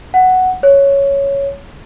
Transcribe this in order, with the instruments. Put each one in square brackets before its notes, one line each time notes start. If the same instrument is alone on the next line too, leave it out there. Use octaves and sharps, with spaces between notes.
[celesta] F#5
C#5